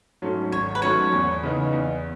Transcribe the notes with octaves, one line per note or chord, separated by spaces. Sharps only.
G#2 F#3 A3 C#4
G#1 C#5
B4
G#2 F#3 A3 C#4 C#5
E2
C#3 E3 B3 D#4
E2